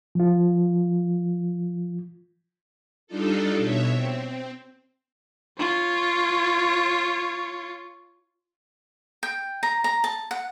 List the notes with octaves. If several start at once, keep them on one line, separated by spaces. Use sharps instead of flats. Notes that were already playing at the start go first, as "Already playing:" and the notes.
F3 F4
G3 D4 D#4 F4 A4
B2 C#5 E5
C4
F4 C#5
G5
A#5
A#5
A5
F#5